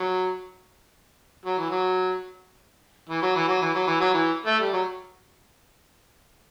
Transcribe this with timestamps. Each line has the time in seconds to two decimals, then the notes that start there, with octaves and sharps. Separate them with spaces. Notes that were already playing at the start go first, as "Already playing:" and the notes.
Already playing: F#3
1.45 F#3
1.58 E3
1.70 F#3
3.09 E3
3.22 F#3
3.35 E3
3.47 F#3
3.61 E3
3.74 F#3
3.87 E3
4.00 F#3
4.13 E3
4.46 A3
4.60 G3
4.73 F#3